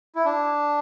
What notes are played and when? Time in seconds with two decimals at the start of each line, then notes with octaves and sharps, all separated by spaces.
0.15 E4
0.25 D4